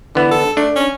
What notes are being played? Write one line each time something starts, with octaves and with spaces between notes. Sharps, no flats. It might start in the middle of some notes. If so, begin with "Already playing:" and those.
D3 E3 B3
A4
A3 D4
C#4